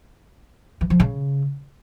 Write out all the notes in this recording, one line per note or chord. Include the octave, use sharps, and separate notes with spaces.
E3
F3
C#3